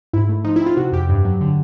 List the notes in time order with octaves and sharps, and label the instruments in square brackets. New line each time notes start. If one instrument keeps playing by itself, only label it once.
[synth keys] G#2 E4
A3
F3 D#4
E4
C4
F4
C3 F#4
F2 G4
G2
F#3
D3